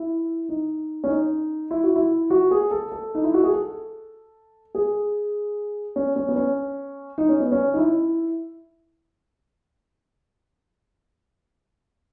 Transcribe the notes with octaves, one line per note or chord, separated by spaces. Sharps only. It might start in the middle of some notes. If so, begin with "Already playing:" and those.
Already playing: E4
D#4
C#4
D#4
E4
F#4
E4
F#4
G#4
A4
A4
D#4
E4
F#4
G#4
A4
G#4
C#4
C#4
B3
C#4
D#4
C#4
B3
C#4
D#4
E4